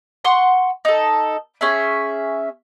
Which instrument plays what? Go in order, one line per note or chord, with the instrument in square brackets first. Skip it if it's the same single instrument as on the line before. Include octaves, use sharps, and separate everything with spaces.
[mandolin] F#5 C6 C#6
D#4 A4
C#4 G#4 E5